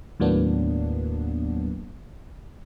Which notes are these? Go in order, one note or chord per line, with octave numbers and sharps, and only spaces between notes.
D#2 A2 F#3 A#3 B3 D4